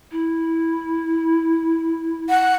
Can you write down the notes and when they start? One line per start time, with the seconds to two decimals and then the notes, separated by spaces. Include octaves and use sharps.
0.11 E4
2.29 F#5